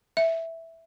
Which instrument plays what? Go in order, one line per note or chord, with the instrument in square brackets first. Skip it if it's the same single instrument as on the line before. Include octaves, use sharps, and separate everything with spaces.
[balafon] E5